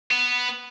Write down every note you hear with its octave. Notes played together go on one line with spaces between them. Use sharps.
B3